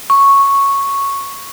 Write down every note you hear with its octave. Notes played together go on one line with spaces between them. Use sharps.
C#6